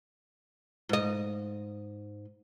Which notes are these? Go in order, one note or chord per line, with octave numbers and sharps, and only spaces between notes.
G#2 D#5